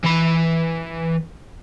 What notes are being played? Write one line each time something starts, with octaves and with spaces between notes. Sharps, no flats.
E3 B5